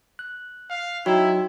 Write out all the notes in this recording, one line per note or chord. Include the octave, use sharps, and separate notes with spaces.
F#6
F5
F#3 D#4 E4 F#4 C#5 G5 A#5